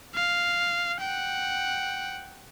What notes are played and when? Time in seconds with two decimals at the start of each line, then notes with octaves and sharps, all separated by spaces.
0.15 F5
1.01 F#5 G5